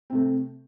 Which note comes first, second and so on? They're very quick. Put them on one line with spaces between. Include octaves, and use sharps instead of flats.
C4 C3 A3